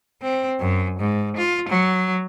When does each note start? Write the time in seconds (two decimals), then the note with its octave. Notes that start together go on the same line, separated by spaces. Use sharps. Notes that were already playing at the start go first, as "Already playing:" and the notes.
0.22 C4
0.59 F#2
1.00 G#2
1.37 F4
1.69 F#3